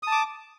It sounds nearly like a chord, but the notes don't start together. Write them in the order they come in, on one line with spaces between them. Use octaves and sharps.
D#6 A5 D6